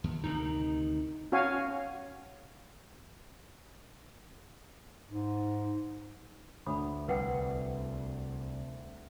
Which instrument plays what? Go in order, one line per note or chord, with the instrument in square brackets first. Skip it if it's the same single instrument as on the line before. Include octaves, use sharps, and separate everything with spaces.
[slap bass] D#2
[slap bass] D2 C3 D#3 [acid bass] D#4
[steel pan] C#4 F#4 C#5 F5 G#5
[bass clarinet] G#2
[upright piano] D2 [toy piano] B5 D#6
[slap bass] C2 [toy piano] B4 F#5 G5